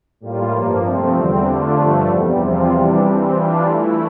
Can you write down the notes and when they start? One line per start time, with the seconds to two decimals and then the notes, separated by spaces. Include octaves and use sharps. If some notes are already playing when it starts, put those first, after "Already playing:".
0.21 A2 G3 A#3 F4
0.52 G2 F3 A#3
0.83 C3 F3 A3 C4
1.14 E2 D3 G3 C4
1.46 D3 A3 D4 F4
1.77 G2 D3 F3 A3
2.08 E2 C3 G3
2.39 E2 C3 F3 C4 F4
2.70 E2 C3 E3 G3 D4
3.01 E3 G3 C4
3.33 E3 G3 D4 F4
3.63 E3 A3 E4